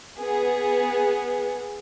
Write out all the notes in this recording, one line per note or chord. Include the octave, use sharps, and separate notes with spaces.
B3 G#4